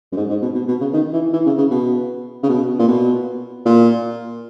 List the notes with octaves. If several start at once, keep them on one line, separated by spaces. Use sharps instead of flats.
F#2
G#2
G#2
B2
B2
B2
C#3
D#3
E3
E3
C#3
C#3
B2
C#3
B2
A#2
B2
A#2